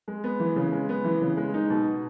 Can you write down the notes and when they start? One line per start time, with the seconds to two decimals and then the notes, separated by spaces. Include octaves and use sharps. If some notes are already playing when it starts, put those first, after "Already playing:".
0.08 G#3
0.24 B3
0.40 E3
0.56 C#3
0.72 G#3
0.89 B3
1.04 E3
1.21 C#3
1.37 G#3
1.54 D#4
1.70 B2